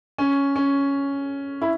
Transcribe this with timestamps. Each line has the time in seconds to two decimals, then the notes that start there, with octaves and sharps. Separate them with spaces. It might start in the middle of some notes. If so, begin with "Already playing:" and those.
0.18 C#4
0.56 C#4
1.62 E4